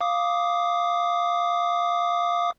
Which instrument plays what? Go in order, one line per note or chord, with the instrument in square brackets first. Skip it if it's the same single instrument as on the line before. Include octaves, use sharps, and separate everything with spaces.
[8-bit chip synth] F5 D6 D#6